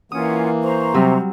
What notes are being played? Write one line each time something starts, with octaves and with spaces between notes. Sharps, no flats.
E3 A#3 C#4 F4 F#5 D#6
C5 A#5 C#6
C3 F#3 G3 C4